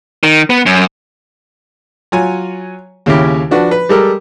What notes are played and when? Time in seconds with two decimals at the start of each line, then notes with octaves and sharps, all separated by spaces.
0.23 D#3
0.50 B3
0.66 F#2
2.12 F#3 F4 C#5 G#5
3.06 D#2 C#3 C#4 E4 G4
3.51 F3 D4 F#4 B4
3.71 B4
3.89 G3 G#3 G4 A4 A#4